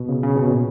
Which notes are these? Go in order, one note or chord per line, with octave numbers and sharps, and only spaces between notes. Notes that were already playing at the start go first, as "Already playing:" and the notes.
Already playing: B2
C#3
C#3
B2
A#2